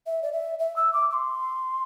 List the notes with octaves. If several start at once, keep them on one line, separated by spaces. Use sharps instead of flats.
E5
D5
E5
E5
E6
D6
D6
C6